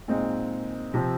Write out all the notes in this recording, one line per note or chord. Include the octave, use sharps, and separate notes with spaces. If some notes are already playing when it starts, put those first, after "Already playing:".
A#2 G#3 C4 D#4
C3 F3 C4